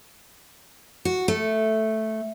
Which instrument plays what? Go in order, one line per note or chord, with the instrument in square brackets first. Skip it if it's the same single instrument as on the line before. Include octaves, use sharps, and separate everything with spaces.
[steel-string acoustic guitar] F#4
A3